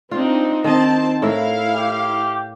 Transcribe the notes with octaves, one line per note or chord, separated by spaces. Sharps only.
C4 D4 D#4 F4
D#3 C4 D#5 A5
A2 E4 A#4 E5 F5
G4